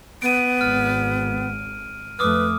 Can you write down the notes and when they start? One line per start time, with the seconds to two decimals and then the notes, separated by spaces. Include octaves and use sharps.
0.22 B3 D7 D#7
0.61 G#1 F6
2.19 F2 A3 B4 D6 D#6 F6